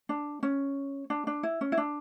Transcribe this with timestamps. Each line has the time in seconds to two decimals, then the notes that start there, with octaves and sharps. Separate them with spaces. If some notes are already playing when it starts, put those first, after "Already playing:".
0.09 D4
0.43 C#4
1.10 D4
1.27 D4
1.43 E4
1.61 C#4
1.72 E4
1.77 D4